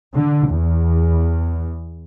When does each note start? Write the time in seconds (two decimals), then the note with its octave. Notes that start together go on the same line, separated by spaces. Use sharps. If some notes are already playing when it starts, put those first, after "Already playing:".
0.14 D3
0.49 E2